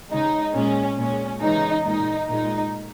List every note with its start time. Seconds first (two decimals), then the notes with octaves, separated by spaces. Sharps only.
0.11 C#3 G#3 D#4
0.54 A#2 G#3 C#4
0.97 A#2 G#3 C#4
1.41 C#3 E3 G#3 D#4
1.85 A#2 G#3 D#4
2.29 A#2 G#3 D#4